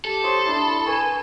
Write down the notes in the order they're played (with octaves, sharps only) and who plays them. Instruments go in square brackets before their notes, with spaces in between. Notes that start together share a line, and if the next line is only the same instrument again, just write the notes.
[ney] G4 [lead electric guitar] A4
[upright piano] C5 C#5 D#6 [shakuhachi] C6
[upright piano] D4 E4 [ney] B5
[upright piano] B4 C#6 [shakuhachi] G#5